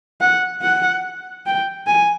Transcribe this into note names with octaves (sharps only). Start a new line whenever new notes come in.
F#5
F#5
G5
G#5